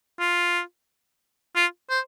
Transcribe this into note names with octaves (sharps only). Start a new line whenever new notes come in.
F4
F4
C5